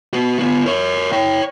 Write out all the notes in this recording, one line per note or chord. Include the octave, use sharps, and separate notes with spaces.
B3 F#4
B3 F4
A#4 C#5
C#5 G5